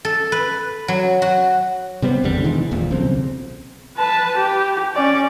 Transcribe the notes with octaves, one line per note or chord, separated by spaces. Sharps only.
A4
B4
F#3
F#4
C3 G3 B3 C4
G#1 E2 D3 G3
B2 D#3 E3 G#3
F1 D#2 A#2 F3
B1 C#3 C4
B4 A5
G4
C#4 D5